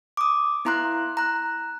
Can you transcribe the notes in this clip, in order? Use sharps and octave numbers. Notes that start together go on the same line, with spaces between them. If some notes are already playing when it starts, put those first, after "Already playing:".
D6 D#6
B3 E4 A#5 C6 F#6
A#5 F#6